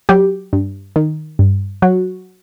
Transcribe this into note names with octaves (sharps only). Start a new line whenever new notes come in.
F#3 G4
G2
D#3
G2
F#3 F#4